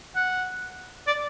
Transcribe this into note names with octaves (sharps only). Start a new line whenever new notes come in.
F#5
D5